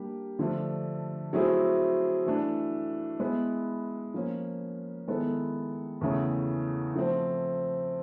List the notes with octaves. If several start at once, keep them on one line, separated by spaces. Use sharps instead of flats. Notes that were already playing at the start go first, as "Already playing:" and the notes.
Already playing: G3 A#3 D4 G4
D3 F3 A3 D4
F#3 A3 C4 E4 G#4
E3 A3 D4
G#3 B3 E4
F3 A#3 C#4
D#3 G#3 B3 E4 A4
E2 C#3 E3 A3 C#4
F3 A3 C4